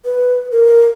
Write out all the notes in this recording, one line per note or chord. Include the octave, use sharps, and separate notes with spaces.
B4
A#4